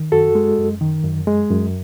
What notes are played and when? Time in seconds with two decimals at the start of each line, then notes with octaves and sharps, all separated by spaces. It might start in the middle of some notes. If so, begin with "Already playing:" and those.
Already playing: D#3
0.12 F#2 F#4 A4
0.35 G#3
0.58 F#2
0.81 D#3
1.04 F#2
1.27 G#3
1.50 F#2